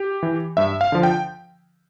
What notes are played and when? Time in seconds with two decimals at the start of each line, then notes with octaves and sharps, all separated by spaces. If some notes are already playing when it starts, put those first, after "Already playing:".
Already playing: G4
0.23 E3
0.57 G2 E5
0.81 F5
0.92 D3 F3
1.03 G5